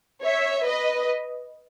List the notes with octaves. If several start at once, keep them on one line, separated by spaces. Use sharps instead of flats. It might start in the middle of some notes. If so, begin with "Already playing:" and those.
C#5 E5
B4 D#5